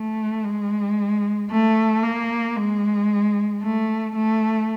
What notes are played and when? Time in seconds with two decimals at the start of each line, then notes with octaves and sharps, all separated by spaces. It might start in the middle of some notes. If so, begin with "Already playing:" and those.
Already playing: A3
0.44 G#3
1.50 A3
2.03 A#3
2.56 G#3
3.62 A3
4.15 A3